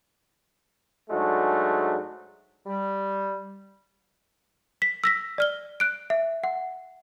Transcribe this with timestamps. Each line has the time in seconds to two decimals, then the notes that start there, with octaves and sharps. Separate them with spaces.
1.10 G#2 F#3 G#3 A3 D4 F#4
2.66 G3
4.82 B6
5.04 E6 A#6 B6
5.38 D5 F6 G7
5.80 F#6 D7
6.10 E5
6.44 F#5